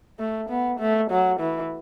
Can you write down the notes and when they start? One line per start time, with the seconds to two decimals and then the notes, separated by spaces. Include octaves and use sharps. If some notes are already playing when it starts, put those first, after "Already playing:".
0.19 A3
0.49 B3
0.79 A3
1.10 F#3
1.40 E3